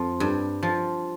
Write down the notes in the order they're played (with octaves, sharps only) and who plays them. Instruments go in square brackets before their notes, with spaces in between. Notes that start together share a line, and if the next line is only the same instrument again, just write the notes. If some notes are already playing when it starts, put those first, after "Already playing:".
Already playing: [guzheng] F2 F3
G2
F3